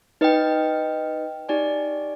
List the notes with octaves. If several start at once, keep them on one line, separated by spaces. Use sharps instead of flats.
D#4 B4 D#5 G5
D#4 G4 D5 G#5